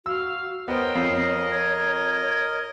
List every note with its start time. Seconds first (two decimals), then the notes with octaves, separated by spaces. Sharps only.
0.06 F#4 F5 E6
0.68 B3 A#4 C5 C#5 D#5 G5
0.95 F2 C7
1.52 G#6